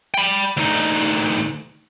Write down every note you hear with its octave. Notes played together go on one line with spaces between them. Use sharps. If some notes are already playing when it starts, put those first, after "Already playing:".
G5 B5
D2 D#4